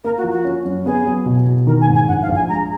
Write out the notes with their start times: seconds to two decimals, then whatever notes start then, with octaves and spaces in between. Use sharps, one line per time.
0.04 A#3 A#4
0.17 F#4
0.24 F3
0.31 F#4
0.45 C#4
0.65 F#2
0.85 B3 G#4
1.06 F#3
1.26 B2
1.47 B2
1.67 D#3 A#4
1.81 G#5
1.87 G#2
1.94 G#5
2.08 A#1 F#5
2.22 F5
2.28 A#1
2.35 G#5
2.49 G#3 A#5